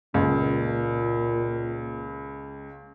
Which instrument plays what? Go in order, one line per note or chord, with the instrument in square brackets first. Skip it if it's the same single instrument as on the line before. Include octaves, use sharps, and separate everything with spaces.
[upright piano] C#2 [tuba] A#2